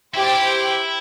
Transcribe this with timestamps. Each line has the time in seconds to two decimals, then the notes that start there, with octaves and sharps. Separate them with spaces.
0.14 E4 G4 C5 G5
0.23 D4
0.32 E4